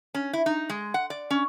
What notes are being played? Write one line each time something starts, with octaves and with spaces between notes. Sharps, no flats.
C#4
E4
D#4
G#3
F#5
D5
C#4